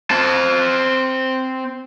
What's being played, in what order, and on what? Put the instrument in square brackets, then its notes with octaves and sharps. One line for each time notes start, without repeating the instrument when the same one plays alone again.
[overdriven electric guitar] C4 A5